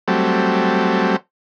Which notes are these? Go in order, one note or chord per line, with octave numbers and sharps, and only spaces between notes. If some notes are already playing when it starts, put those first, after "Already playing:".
F#3 G3 A3 C4